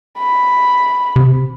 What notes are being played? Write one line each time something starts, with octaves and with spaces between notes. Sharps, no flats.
B5
C3